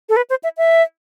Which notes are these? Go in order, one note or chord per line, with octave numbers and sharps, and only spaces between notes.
A4
B4
C5
E5
E5